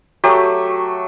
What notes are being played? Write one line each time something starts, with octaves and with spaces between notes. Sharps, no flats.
F#3 A3 G4